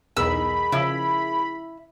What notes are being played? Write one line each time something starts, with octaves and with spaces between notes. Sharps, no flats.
B1 E2 G#4 A#4 D#5 B5 E6
C#3 F3 E4